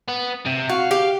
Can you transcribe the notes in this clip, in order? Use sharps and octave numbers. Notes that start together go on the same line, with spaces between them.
B3
C3
F#4 F5
G4